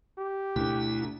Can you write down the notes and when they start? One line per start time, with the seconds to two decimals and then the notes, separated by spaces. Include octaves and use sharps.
0.18 G4
0.56 D2 B2 D3 E4